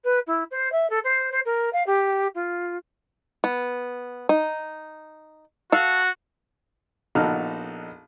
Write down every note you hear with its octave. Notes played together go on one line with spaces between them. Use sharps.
B4
E4
C5
E5
A4
C5
C5
A#4
F5
G4
F4
B3
D#4
F#4 A4 F5
A#1 B3 D#4 F#4 A4 F6